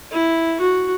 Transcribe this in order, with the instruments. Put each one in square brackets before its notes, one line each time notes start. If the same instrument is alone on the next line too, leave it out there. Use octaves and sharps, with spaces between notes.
[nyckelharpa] E4
F#4